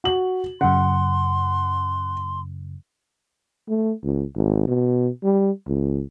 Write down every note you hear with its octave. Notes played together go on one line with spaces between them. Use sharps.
F#4 F#7
F#2 C#3 F#5 C6
A3
C#2
G#1
B2
G3
C#2